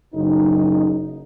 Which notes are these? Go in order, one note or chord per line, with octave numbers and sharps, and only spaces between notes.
F#1 D#4